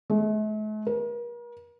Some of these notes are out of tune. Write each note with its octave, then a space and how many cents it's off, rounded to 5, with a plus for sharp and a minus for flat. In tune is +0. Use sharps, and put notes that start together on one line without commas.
A3 -45
A#4 +40